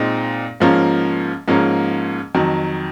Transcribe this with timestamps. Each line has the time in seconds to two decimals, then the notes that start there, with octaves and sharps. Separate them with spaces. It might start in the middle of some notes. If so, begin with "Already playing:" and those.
Already playing: A#2 G#3 C4 D#4
0.60 G#2 F3 A#3 C#4
1.48 G#2 F3 A#3 C#4
2.35 F2 D#3 F#3